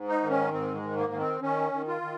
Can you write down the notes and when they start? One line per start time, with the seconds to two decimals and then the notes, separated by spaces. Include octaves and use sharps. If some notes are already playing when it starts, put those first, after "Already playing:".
Already playing: G#2
0.08 D#4
0.22 D#3
0.30 C#4
0.53 G#2 C4
0.74 G#3
0.82 D#3
0.97 A#3
1.12 D#3
1.20 C4
1.42 D#3 C#4
1.73 D#3
1.87 F4
2.02 D#3